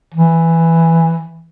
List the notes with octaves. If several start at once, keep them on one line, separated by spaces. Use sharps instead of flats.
E3